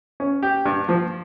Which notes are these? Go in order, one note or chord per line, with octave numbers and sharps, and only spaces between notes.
C#4
G4
G2
F3